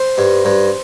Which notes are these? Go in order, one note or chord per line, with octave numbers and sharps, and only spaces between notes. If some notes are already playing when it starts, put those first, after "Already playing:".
Already playing: C5
G2
G2